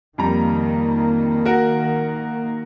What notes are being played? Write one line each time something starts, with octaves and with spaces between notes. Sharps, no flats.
F2 D#3 G3 A#3 A#5
F#4 A#4 F#5